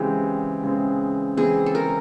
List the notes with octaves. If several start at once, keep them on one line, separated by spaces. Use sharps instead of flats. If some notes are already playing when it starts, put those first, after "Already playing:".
Already playing: C#3 E3 G#3 C4 G4
C#3 E3 G#3 C4
C#3 E3 G#3 C4 G#4
A4
A#4